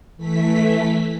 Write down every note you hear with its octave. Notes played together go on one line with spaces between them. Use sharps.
E3 A3 B6